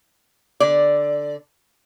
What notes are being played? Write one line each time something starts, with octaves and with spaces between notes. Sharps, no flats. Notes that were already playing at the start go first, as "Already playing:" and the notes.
D3 D5